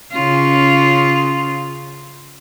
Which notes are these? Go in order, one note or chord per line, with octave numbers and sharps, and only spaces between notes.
C#3 C#4 F4